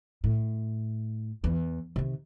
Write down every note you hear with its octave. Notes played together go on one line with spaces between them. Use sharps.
A2
E2
C3 D#3